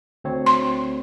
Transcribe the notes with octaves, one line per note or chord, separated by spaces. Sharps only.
D2 C4 C#5
C6